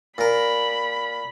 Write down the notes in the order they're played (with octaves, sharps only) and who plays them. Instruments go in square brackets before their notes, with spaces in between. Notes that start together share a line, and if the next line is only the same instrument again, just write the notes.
[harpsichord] A#2 A#4 [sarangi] B5